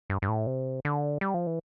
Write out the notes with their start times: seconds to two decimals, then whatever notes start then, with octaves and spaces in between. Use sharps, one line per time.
0.10 G2
0.22 G2
0.28 A2
0.47 C3
0.85 D3
1.21 G3
1.34 F3
1.47 E3